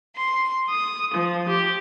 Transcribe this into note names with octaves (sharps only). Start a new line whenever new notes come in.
C6
D#6
F3
G4